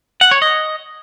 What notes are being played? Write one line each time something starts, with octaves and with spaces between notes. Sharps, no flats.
F#5
C#5
D#5